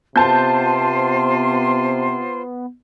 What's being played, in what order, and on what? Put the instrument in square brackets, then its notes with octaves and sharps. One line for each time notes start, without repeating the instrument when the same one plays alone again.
[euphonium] C3 [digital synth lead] B3 [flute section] F4 C5 C6 [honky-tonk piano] A5 G6